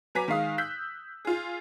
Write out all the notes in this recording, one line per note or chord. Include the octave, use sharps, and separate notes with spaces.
F#3 B4 G#5 A#5 D6 B6
D#3 G#3 F5 D#6
E6 F#6 G6 B6
F4 G#4